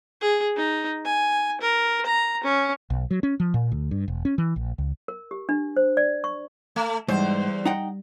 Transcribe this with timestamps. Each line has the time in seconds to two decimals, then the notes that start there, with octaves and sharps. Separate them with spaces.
0.21 G#4
0.56 D#4
1.05 G#5
1.61 A#4
2.06 A#5
2.43 C#4
2.90 B1
3.11 F#3
3.23 C#4
3.40 F3
3.54 A#2
3.72 D2
3.91 G2
4.08 E1
4.25 C#4
4.38 E3
4.56 A#1
4.78 C#2
5.08 A#4
5.31 G4
5.49 D4
5.77 C5
5.97 D5
6.24 C#6
6.76 A3
7.08 E2 G#2 G3 C5
7.65 D#4 F#5 G5